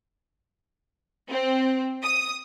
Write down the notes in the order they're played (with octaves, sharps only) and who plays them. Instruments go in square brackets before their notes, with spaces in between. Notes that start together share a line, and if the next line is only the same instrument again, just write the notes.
[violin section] C4
D#6